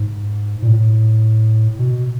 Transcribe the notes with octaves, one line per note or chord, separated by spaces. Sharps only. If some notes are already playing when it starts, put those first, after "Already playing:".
Already playing: G#2
A#2
A2
B2